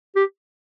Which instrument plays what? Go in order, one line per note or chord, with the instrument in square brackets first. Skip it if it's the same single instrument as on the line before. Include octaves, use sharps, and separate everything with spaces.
[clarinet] G4